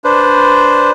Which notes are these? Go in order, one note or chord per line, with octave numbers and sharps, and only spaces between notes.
D4 B4 C5